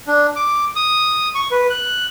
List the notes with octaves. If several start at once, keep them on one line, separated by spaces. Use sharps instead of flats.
D4
D6
D#6
C#6
B4
F#6